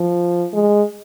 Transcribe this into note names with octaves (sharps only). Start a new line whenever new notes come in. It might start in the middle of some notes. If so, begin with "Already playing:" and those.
Already playing: F3
G#3